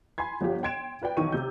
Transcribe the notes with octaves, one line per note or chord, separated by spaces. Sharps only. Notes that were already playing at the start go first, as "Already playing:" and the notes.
G#5 B5 C6 G#6
G1 F3 G4
G5 C6 G#6 D7 E7
F4 B4 D5 G5
B1 D#3 E3 C#6 D#7
C3 G6